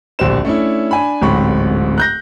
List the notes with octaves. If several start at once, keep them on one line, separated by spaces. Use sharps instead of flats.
D1 A#1 G4 C5 E7
A3 C#4 D4 E4
D4 G#5 B5
D1 A1 G#2 C4 B5 C#6
F#6 G6 A#6